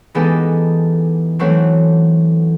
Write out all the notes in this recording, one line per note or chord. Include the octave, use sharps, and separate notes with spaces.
E3 G#3 B3 D#4 G4 A4
E3 F#3 A3 C4 F#4